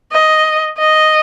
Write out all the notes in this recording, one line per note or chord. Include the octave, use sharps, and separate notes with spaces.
D#5
D#5